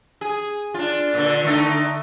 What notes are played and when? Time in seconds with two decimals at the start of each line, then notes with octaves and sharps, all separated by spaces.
0.21 G#4
0.74 D4 F4
1.14 A#2 D3
1.44 D3 A3 D#4